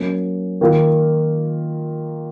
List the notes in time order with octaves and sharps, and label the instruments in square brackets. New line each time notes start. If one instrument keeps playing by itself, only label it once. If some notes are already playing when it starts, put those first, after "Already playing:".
Already playing: [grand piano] F#3 A#3 C#4
D#3 A#3 F4 A#4